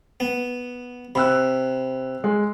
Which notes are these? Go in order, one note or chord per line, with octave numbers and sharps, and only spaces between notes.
B3
C3 B5 E6 F#6
G#3